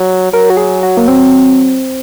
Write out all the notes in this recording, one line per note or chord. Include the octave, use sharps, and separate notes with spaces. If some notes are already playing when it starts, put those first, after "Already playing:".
Already playing: F#3
F#3 A#4
F#4
G#4
F#4
A#3
C4